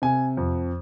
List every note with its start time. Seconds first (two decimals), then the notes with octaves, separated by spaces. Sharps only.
0.02 C3 G#5
0.37 F2